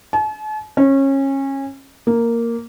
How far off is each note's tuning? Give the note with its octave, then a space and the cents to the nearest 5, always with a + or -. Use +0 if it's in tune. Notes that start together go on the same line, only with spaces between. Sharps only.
A5 -45
C#4 -25
A#3 -5